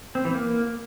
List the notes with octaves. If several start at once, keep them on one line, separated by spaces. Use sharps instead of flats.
C4
E3
A#3